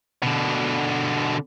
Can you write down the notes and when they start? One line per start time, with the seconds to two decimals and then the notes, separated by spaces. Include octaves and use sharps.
0.23 B2 D3